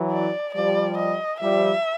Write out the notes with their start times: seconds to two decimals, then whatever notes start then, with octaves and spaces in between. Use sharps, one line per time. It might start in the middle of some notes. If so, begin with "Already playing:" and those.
Already playing: E3 F#3
0.12 D5
0.55 F3 G3 D5
0.98 D#5
1.41 F3 G3 E5